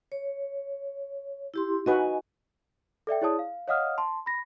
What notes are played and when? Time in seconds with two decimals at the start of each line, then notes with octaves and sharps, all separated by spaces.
0.12 C#5
1.54 E4 G4 C6
1.86 D#4 F#4 B4 D#5 G#5
3.07 A4 D5 E5 G5
3.22 E4 G#4 C#5 D5 A5 D#6
3.39 F5
3.68 C#5 D#5 F5 F#5 D#6 F6
3.98 A5 C6
4.26 B5 A#6